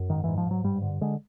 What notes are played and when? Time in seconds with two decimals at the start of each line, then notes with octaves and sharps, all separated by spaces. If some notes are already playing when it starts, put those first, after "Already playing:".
Already playing: F#2
0.10 G#2 D#3
0.24 E3
0.28 G#2
0.38 F3
0.47 G#2 F#3
0.64 G2 G3
0.82 D3
1.01 D3 G#3